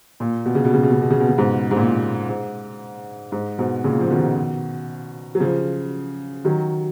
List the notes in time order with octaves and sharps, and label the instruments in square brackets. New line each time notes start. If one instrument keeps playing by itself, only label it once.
[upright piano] A#2
B2
C#3
B2
C#3
B2
C#3
B2
C#3
B2
C#3
G#2 B2
G#2
A#2
G#2
G#2
G#2 B2
A#2 C#3
F3
B2 D#3
F#3
C#3 F3
D#3 F#3